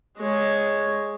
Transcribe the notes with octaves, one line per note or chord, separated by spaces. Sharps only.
G#3 C#5